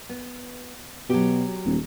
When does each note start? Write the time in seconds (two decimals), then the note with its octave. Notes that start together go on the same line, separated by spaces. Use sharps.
0.09 B3
1.10 B2 F#3 G4
1.65 D#1